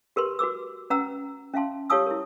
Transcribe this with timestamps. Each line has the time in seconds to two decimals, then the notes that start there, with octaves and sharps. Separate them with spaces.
0.16 G4 A#4 B4 C6
0.39 F#4 B4 D6 E6
0.90 C#4 B4 F#5 A#5 E6
1.53 C#4 E5 F5 A5 C6
1.90 G4 C#5 F5 A5 D#6 E6
2.06 E4 A#4